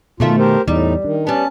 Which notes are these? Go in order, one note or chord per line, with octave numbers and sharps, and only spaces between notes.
F#2 B2 D#3 A3 F4 E5
G4 A#4 C5
E2 A2 G3 D#4
D#3 D4
G3 B3 C#4 A5